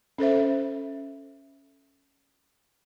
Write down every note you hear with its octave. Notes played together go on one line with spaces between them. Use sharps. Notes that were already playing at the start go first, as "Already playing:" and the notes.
C#4 A4 C5 E5